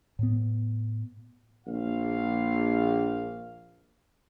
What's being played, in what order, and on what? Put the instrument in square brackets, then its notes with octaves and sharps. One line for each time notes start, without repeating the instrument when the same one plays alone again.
[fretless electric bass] A2 B3
[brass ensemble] A#1 F5